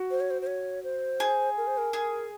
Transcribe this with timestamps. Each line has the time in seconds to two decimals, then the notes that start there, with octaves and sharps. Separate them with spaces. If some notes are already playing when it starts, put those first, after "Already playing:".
Already playing: F#4
0.11 C5
0.20 C#5
0.30 C5
0.42 C5
0.47 C#5
0.84 C5
1.20 G#4
1.57 A#4
1.67 C5
1.78 A#4
1.93 G#4